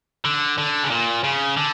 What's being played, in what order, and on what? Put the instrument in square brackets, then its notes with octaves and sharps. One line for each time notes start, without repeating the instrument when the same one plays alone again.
[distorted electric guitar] D3
D3
C#3
A#2
C#3
D3